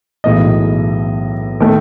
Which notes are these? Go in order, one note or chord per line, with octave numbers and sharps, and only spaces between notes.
B1 A2 E3 G#3 D#5
D#3 A3